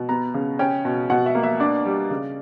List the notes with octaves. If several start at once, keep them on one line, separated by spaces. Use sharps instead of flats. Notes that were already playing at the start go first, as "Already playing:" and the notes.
Already playing: B2
B3 A#5
C#3
C#4 G5
B2
B2 F#5
E5
A#3
E5
D4 D5
G3
C#3